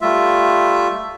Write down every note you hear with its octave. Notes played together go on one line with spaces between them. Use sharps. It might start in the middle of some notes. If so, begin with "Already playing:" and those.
G3 A3 F4 E5